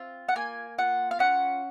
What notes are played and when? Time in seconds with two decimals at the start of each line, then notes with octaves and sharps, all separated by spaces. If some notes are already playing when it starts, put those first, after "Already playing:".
Already playing: C4 F4
0.29 F#5
0.35 A#3 G#5
0.78 F4 F#5
1.11 F5
1.19 C#4 F#5